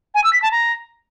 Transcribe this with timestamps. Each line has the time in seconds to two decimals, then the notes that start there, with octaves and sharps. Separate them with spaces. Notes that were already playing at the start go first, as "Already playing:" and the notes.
0.14 G#5
0.24 E6
0.33 B6
0.42 A5
0.51 A#5